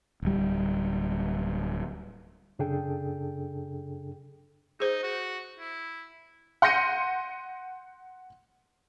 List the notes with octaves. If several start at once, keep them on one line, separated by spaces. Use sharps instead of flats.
D1 G3
F#2 C#3 D4 G#4 A4 G5
D#4 G#4 C5
F#4
E4
F#5 C6 G6 A#6 C#7 D#7